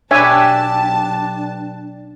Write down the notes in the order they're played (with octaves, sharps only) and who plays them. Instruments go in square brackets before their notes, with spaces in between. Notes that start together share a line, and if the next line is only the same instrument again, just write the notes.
[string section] B1 A5 [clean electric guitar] D4 [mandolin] G4 B4 [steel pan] C#5 E5 G#5